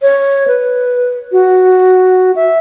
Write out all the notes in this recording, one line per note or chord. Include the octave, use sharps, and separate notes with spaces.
C#5
B4
F#4
E5